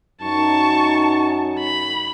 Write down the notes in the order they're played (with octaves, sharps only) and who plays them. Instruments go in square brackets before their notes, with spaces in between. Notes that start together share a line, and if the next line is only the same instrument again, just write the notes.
[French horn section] F#2 D#4 [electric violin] A5 C#6
[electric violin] B5